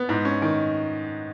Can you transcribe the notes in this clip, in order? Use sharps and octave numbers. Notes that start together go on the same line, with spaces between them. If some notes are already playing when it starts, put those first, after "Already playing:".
Already playing: B3
G#2
C#4
D#3